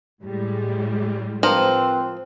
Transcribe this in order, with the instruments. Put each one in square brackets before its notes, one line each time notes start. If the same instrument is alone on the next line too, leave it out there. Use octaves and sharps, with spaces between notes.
[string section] A2 G3 G#3
[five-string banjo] F3 A#4 [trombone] C4 [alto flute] B4